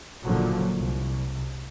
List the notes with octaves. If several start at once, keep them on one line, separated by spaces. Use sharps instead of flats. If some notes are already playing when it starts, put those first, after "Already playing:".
F#1 A#2 D3 F3 F#3
C2